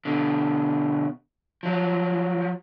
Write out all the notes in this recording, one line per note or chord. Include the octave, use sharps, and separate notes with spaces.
B2 D3
F3 F#3